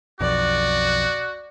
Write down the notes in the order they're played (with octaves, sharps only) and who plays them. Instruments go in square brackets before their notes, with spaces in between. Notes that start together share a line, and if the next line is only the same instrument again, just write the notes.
[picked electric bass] B1 F2 [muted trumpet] F#4 [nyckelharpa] D5